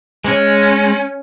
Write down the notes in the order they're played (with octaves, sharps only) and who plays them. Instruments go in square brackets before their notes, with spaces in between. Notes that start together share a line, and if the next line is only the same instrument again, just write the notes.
[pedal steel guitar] G#3 [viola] C#4